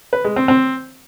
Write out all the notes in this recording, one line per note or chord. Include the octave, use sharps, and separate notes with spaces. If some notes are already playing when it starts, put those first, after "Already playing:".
B4
G#3
C4
C4